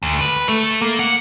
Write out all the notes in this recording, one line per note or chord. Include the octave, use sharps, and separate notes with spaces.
D2
B4
A3
A#3
F#5